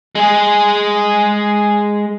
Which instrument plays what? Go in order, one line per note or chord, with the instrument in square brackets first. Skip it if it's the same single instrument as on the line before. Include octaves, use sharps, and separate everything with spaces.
[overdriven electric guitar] G#3 G#4